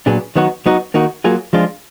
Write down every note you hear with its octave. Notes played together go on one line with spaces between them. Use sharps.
A#2 F#3 B3 D4 G#4
D#3 F#3 B3 D#4 F#4
F#3 B3 D#4 F#4
D#3 A#3 D#4 F#4
F#3 A#3 F4 G#4
F3 G#3 D4 F4